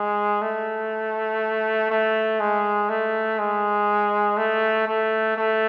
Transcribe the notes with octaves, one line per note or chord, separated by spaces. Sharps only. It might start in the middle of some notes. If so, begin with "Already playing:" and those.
Already playing: G#3
A3
A3
G#3
A3
G#3
A3
A3
A3